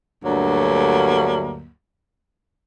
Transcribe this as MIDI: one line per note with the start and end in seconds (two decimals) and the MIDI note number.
0.23 1.70 38
0.23 1.70 43
0.23 1.70 54
0.23 1.70 58